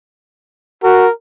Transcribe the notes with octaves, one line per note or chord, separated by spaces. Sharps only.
F#4 A#4